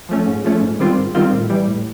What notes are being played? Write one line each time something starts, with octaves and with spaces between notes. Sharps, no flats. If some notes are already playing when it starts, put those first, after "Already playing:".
F3 A3 C#4
G#2
F3 A3 C#4
G#2
D#3 G3 C4 F4
G#2
D#3 G3 C4 F4
A2
E3 G3
A2